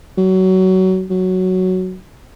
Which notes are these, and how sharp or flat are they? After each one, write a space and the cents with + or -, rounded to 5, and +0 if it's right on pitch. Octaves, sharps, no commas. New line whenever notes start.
F#3 +20
F#3 +5